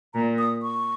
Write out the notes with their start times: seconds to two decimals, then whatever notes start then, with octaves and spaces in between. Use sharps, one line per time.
0.14 A#2 A#5
0.38 D#6
0.63 C#6